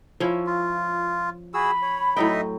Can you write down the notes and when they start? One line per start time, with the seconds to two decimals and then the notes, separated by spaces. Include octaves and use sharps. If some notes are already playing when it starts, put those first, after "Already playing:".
0.20 F3 C#4 E4
0.47 F4
1.54 F#4 G#4 B5 E6
1.82 C#5
2.17 A2 F#3 D#4 D#5 E5 G5